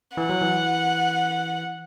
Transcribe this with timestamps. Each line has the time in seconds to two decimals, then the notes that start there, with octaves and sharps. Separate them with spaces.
0.17 E3 F#5
0.29 F#3
0.42 E3